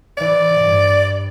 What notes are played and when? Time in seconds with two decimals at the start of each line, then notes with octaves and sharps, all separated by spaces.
0.18 E3 D5
0.62 G2